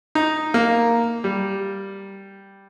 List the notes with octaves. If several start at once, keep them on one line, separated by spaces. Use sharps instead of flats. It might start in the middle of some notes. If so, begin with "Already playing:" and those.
D#4
A#3
G3